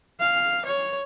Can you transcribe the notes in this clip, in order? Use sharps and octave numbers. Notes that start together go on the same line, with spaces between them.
F5
C#5